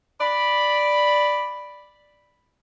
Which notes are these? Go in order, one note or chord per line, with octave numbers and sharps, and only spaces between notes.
D5 B5